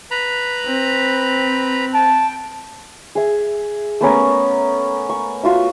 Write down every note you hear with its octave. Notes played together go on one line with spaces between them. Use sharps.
B4 A#5 B5
C4
G5 A5
G#4 E5
A3 B3 C#4 A#4
C#6
F4 F#4 E5